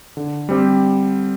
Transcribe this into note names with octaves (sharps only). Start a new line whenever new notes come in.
D3
G3 C4 G4